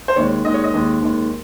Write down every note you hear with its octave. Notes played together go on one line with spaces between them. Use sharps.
C5
D#2 D#3 G#3 C#5
D#2 D#3 G#3 D#5
C#5
D#5
D#2 D#3 G#3
D#2 D#3 G#3